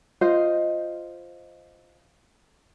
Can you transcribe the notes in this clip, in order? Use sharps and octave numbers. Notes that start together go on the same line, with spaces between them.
F4 C5 D#5